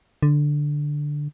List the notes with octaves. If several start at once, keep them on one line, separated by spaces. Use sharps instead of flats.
D3